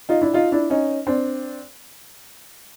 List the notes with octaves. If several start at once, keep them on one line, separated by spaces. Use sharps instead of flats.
D#4 F4
D4 E4
D#4 F4
D4 E4
C#4 D#4
C4 D4